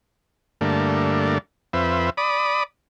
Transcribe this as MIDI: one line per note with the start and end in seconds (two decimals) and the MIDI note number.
0.61 1.38 43
0.61 1.38 50
0.61 1.38 57
0.61 1.38 58
1.73 2.10 41
1.73 2.10 60
1.73 2.10 71
1.73 2.10 76
2.17 2.63 74
2.17 2.63 83
2.17 2.63 87